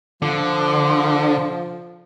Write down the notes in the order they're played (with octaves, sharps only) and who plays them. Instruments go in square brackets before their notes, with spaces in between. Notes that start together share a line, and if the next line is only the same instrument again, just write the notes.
[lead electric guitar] D3 [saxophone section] F3